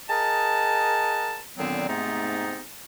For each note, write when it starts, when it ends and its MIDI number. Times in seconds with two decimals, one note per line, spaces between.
0.09 1.39 68
0.09 1.39 70
0.09 1.39 75
0.09 1.39 78
0.09 1.39 81
1.57 1.87 46
1.57 1.87 50
1.57 1.87 51
1.57 1.87 54
1.57 1.87 59
1.57 1.87 60
1.88 2.62 44
1.88 2.62 48
1.88 2.62 57
1.88 2.62 59
1.88 2.62 60
1.88 2.62 63